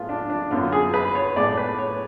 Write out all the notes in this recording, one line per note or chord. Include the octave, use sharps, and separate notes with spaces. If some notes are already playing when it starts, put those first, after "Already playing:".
Already playing: A2 G#3 B3 F4
D4
D4
F#2 D3 F#3 B3 F4
G#4
B4
C#5
A2 G#3 B3 D5
B4
C#5